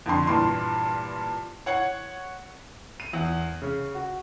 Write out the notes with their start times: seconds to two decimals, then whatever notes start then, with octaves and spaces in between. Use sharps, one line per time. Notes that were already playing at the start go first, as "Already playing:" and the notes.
0.06 F2 D3 C6
0.27 G2 A#2 E3 C6
1.66 C#5 F#5 G#6 C#7
3.00 D#7
3.13 E2
3.62 C#3
3.94 F#4